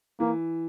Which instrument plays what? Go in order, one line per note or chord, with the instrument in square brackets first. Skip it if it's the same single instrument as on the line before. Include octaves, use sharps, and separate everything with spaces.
[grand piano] E3 [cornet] A#3